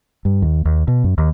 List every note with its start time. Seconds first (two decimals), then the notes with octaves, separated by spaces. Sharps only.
0.25 G2
0.42 D#2
0.65 D#2
0.88 B2
1.04 F#2
1.18 D#2